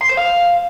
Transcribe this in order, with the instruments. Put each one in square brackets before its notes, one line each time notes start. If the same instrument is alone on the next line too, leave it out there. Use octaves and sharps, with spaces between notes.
[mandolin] C6
C5
F5